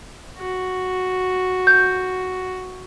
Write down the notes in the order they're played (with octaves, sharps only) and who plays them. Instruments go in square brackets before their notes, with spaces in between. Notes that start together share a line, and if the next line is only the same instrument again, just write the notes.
[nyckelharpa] F#4
[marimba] G6